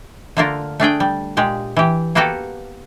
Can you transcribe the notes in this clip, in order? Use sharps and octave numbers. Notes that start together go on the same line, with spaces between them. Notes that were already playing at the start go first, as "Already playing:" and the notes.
D3 A3 A#3 D4 F4 A#4
A3 D4 G#4 G5
G3
A#2 G#3 G4
E3 G4
A#3 B3 F#4 G4 A4 B4